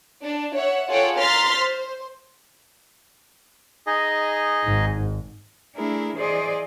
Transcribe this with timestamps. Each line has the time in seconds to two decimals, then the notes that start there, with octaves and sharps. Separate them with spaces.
0.24 D4
0.56 C#5 E5 F#5
0.89 F4 G#4 A4 C#5 F#5 G5
1.18 A#5 C6 F6 A6 B6
1.55 C5
3.87 D#4 G#4 D#5
4.65 G#1 G#2
5.75 A3 D4 E4 G#4 A#4
6.15 E3 G#4 C5 D5 D#5